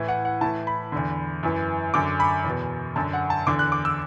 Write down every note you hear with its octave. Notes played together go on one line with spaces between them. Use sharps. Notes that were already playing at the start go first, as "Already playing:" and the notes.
Already playing: A2 E3
F#5
F#5
A2 E3 A5
B5
E2 D3
F#2 E3
F#2 D3 D6
B5
E2
B2
F#2 D3 A5
F#5
A5
E2 D3 D6
F#6
D6
E6